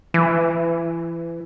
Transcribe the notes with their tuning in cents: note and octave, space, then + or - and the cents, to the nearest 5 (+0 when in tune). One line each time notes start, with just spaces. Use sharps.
E3 +30